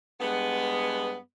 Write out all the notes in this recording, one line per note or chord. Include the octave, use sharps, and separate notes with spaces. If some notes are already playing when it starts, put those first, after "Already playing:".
G2 G#3 B3